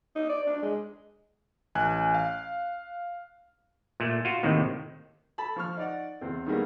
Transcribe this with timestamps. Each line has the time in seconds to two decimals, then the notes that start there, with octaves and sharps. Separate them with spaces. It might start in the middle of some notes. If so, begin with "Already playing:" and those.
0.16 D#4
0.29 D5
0.47 D4
0.62 G#3
1.75 A1 G#5 F#6
2.14 F5
4.00 A#2 A3
4.25 F4 F#4
4.43 D#2 A2 C3 D#3
5.38 A4 A5 B5
5.56 F3 C#6 F6
5.77 D#4 D5 F#5
6.21 E2 C4
6.46 D#3 E3 G3 G#3 A#3 B3